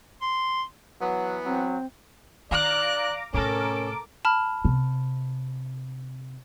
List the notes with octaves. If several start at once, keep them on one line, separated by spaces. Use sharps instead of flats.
C6
E3 F#3 B3
F#3 C4
D#3 D5 F5 A#5 D6 F#6
A2 C3 C#4 A4 A#4 D6
A5 B5 F6
C3